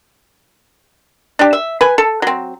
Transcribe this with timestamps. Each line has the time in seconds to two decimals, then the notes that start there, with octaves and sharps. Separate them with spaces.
1.39 D4 G4
1.53 E5
1.81 B4 G#5
1.98 A4
2.22 F#3 C4